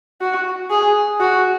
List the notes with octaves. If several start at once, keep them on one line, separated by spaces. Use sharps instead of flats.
F#4
G#4
F#4